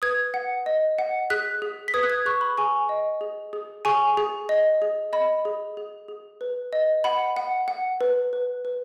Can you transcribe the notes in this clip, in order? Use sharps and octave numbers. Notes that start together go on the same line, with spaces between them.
B4 D#6 G#6
F#5
D#5
F#5
G#4 F#6 B6
G#4
B6
B4 D#6 G#6
F#6
D#6 G#6
G#4 C#6 F#6
B5
G#4 G#5 C#6
D#5
G#4
G#4
G#4 G#5 C#6
G#4
D#5
G#4
D#5 B5
G#4
G#4
G#4
B4
D#5
F#5 B5
F#5
F#5
B4
B4
B4